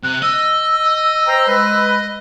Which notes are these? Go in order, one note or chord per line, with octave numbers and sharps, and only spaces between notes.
C3 F#6
D#5 E6
C5 G5 A#5
G#3 B4